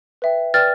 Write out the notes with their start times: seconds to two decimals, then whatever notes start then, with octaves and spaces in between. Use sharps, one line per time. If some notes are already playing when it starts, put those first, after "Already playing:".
0.22 B4 E5 G5
0.54 B4 D5 G5 F6 A6